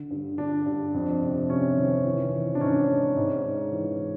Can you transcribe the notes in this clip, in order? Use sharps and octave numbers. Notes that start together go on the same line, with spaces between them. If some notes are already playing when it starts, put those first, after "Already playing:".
Already playing: D3
G2
D3 D4
G2
F2
C3
C3 C#4
D#3
E3
E3
D4
G#2 C#4
G#2
G#2
G#2
E3
E3